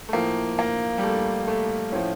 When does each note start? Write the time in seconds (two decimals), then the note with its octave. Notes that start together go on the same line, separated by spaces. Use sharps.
0.09 A3
0.13 A2 F3 A#3
0.59 A#3
0.98 G3
1.03 A3
1.47 A3
1.92 A2 F3 C#4